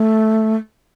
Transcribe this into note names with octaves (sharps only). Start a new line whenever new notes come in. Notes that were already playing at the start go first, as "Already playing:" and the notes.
Already playing: A3